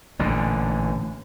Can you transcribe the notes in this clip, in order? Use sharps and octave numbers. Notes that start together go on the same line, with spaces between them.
A1 A#2 D3